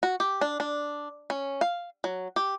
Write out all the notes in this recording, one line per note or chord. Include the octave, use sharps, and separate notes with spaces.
F#4
G4
D4
D4
C#4
F5
F#3
G4